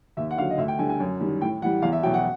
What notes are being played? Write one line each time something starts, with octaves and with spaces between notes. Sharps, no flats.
D#2 E5
F#5
D3 F#3 F5
D#5
D2 E5
G5
D3 G3 G#5
G#5
F#2
D#3 G3
A2 G5
E3 G3 F#5
E2 F5
E5
B2 F#3 G5
F#5